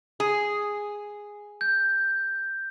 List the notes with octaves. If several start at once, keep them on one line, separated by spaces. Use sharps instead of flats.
G#4
G6